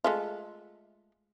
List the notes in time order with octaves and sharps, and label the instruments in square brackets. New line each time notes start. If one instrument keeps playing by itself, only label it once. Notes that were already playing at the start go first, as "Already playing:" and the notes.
[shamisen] G#3 A3 F4